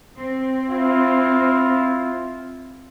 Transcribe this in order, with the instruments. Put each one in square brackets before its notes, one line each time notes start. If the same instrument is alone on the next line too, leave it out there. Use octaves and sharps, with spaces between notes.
[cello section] C4
[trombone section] E4 F4